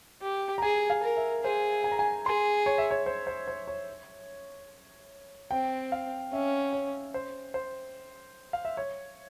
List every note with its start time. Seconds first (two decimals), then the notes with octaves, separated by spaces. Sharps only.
0.22 G4
0.58 A#5
0.62 G#4 G#5
0.90 F5
1.03 A#4
1.17 E5
1.44 G#4 C5
1.84 G#5
1.92 A#5
1.99 G#5
2.26 G#4 C6
2.66 C#5
2.78 E5
2.91 C#5
3.06 C5
3.27 C5
3.48 C5
3.68 C#5
5.51 C4 G5
5.92 F5
6.32 C#4 E5
6.73 C#5
7.14 C5
7.54 C5
8.53 F5
8.65 E5
8.77 C#5